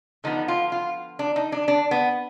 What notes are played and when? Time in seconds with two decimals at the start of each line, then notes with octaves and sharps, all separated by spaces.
0.24 D3 F3 B3 D#4
0.48 F4
0.72 F4
1.19 D4
1.36 D#4
1.52 D4
1.68 D4
1.91 B3